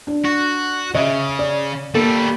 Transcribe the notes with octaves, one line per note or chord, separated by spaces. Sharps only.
D4
F#4
C#3 D#5 E5
D5
G3 A#3 A4